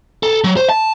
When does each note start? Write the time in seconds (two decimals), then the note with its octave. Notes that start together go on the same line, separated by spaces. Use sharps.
0.23 A4
0.44 F#3
0.57 C5
0.69 A5